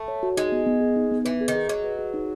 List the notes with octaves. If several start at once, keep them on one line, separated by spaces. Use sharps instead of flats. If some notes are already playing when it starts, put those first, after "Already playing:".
Already playing: A3
C#5
F#4
G#3 D#4
B3
B3
G#4
D#4
B3
E3 B4
G#4
D#3
G#4
F#3 D#5
B4
G#4
D#4